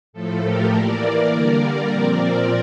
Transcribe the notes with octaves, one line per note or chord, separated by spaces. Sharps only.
A2 F3 A3 A4
G4 A#4
E3 A#3 A#4 D5
D3 G3 A#3 A#4 D5
A#2 F3 C4 A#4 D5